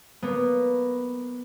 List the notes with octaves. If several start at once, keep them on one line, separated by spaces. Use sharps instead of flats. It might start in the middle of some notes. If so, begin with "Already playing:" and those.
A#3 B3